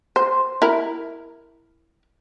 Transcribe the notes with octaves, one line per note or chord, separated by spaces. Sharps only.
C5
E4 A#4